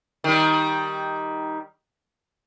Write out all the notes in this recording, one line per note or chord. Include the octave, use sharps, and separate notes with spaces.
D#3 G3